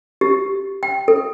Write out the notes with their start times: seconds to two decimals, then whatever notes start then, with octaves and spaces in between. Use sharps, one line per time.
0.21 G4
0.83 G5
1.08 A4